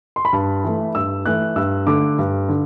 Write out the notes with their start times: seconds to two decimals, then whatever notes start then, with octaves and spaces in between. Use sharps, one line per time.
0.16 C6
0.25 B5
0.33 G2 A5
0.64 E3 A3
0.95 G2 E6
1.26 E3 A3 F#6
1.56 G2 E6
1.87 D3 A3 D6
2.18 G2
2.49 D3